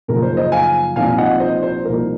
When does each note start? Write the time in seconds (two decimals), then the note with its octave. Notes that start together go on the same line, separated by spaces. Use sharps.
0.08 F#2 C#3 F3 A#3 D#4 A#4
0.22 C5
0.37 C5 D#5
0.52 F5 G#5
0.96 C2 A#2 F3 C4 D#4 F5 G#5
1.18 D#5 F#5
1.40 C5 D#5
1.62 C5
1.84 C2 A#2 F3 A#3 D#4 A#4